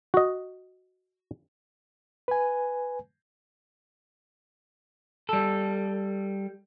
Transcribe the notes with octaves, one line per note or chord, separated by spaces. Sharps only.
F#4 D#5
B4 G#5
G3 A4